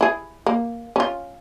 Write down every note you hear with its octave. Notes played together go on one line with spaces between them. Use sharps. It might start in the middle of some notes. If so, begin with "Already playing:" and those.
E4 G#4
A#3
C#4 F4